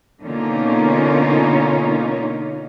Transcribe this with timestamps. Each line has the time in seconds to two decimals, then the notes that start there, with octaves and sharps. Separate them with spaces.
0.21 B2 D3 A#3 C#4 D#4 F4